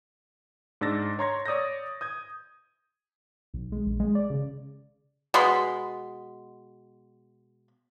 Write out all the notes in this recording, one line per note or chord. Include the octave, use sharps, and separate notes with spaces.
G#2 D4 E6 A6 A#6
C#5 A#5 C6 C#6 G#6 A#6
C#5 D5 D#6 E6 G6 A#6
D#6 G6 G#6
B1
G#3
A#1
G#3
D5
C#3
B2 G#3 B5 C6